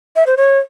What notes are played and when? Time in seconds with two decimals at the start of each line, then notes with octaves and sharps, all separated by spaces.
0.16 E5
0.27 C5
0.37 C#5